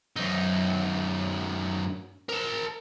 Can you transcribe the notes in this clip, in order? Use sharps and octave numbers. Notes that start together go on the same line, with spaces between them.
F#2 D#4
A#4 A5